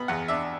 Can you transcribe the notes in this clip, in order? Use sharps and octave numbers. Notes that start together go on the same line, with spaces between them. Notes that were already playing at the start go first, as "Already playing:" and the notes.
Already playing: B2 B3 B5
E2 F#5
D4 E5